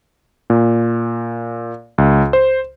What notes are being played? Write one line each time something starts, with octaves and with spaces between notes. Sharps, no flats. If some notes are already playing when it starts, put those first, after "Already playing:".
A#2
C#2
C5